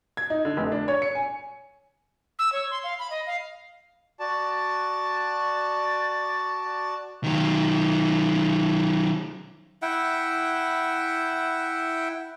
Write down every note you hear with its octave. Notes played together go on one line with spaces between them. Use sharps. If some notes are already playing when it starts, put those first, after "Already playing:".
G#6
D#4
D3
F1
D4
C#5
C#7
G#5
E6
C#5
C6
F5
B5
D#5
F5
F#4 D5 A5
D#3 F#3
E4 E5 F#5 G5